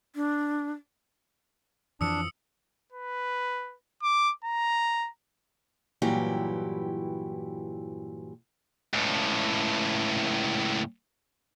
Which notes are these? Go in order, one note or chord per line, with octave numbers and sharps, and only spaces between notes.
D4
F2 E3 F3 D4 D#6 E6 C#7
B4
D6
A#5
G2 A#2 E3 F#3 E4 G4
C#2 A2